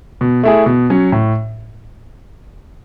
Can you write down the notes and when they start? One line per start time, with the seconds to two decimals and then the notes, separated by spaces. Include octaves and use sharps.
0.21 B2
0.43 A3 E4 G#4
0.66 B2
0.90 F#3 C#4
1.12 A2